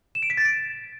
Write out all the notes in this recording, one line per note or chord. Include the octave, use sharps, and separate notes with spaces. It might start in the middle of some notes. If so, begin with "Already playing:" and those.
E7
D7
B6
A6
D7